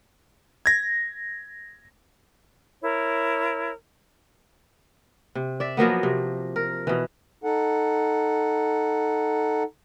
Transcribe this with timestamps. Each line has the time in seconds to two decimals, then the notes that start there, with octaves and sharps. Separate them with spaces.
0.66 G#6 A#6
2.81 E4 A#4 C#5
5.35 C3
5.60 D5 E5
5.77 F3 F#3 A#3 B3
6.03 C3
6.56 A#4
6.87 B2 E3
7.44 D#4 A4 F#5